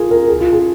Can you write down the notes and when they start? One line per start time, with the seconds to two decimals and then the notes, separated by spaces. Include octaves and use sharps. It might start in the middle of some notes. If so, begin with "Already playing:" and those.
Already playing: F4 G#4 A#4
0.11 A#4
0.29 G#4
0.40 F4
0.53 G#4